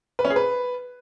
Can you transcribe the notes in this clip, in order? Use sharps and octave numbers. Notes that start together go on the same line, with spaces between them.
B4
C#4
G#4
B4